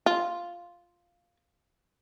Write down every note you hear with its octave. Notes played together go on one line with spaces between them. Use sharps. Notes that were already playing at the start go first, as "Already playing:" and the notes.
F4